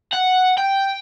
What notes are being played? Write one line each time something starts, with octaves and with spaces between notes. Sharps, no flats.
F#5
G5